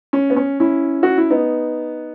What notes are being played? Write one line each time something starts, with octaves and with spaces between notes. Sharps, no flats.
C#4
B3
C#4
C#4 E4
F#4
E4
B3 D#4